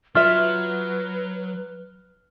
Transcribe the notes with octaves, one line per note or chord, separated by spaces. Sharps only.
F#3 F4 B4 E5 F6